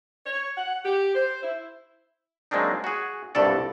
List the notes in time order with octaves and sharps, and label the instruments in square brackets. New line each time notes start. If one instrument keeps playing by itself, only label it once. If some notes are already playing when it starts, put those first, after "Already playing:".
[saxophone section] C#5
F#5
G4
C5
E4
[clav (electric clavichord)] F#3 G#3 A#3 C4 D4 D#4
F#4 G#4
C2 G2 B2 A4 D5